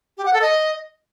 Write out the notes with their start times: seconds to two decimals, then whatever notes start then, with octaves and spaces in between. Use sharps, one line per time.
0.17 G4
0.25 F#5
0.33 A4
0.41 D#5